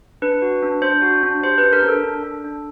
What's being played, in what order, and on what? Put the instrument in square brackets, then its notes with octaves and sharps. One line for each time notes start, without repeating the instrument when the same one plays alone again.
[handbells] D4 B4
F#4
D4
D4 C5
F#4
D4
G4 C5
B4
D4
A#4
D4
A4
D4
D4
D4